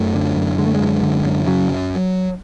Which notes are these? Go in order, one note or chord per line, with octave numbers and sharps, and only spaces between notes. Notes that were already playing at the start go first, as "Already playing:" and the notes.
Already playing: F#2 A3
D3
F#2
D3 G#3
A3
G#3
F#2
D3
F#2
C#3 F#3
F#2